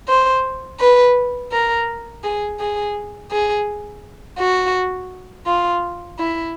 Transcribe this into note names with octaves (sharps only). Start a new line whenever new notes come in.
C5
B4
A#4
G#4
G#4
G#4
F#4
F4
E4